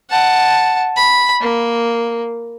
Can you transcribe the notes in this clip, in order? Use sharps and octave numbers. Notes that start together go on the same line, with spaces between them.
F#5 A5
B5
A#3